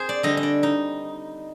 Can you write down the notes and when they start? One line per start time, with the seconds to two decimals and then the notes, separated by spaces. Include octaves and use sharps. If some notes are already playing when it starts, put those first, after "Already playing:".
Already playing: C4 G#4 C5
0.09 D5
0.23 D3 G3 D4 D#5
0.37 D#5
0.43 D5
0.63 D#4